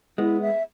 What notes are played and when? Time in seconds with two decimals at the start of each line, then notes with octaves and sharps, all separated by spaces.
0.18 G#3 B3 E4
0.41 E5